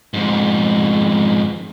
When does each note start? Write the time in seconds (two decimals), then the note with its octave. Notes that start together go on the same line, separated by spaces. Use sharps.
0.14 F2 G#2